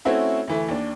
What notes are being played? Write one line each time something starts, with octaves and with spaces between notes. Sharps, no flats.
A3 C4 C#4 E4 F#4
D2 E3 A3
D#2 D4